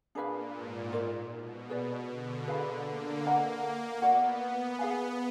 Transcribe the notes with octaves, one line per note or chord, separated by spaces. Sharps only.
A#2 D4 G#4 B4 F5
G#2
F4 A#4 D5
B2
G#4 B4 D5
D3
G#4 B4 F5 B5
A#3
A#3 B4 D#5 F#5 A#5
B3 F#4 D5 F#5
B3
G#4 B4 F5 G#5